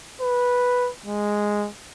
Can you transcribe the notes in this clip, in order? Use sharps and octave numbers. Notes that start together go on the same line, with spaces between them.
B4
G#3